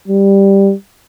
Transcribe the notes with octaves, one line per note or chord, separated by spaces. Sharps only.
G3